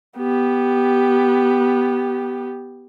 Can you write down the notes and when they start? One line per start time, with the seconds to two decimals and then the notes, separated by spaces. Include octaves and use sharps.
0.18 B3 G4